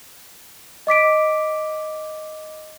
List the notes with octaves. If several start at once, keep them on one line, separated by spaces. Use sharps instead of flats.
D#5 D6 B6 D7